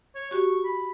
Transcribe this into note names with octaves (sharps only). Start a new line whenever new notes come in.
C#5
F#4 G4 C#6
B5